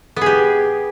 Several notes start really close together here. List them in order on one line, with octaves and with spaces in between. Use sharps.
B3 G#4 G4